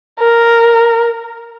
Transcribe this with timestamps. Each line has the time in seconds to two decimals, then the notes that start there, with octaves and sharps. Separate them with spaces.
0.19 A#4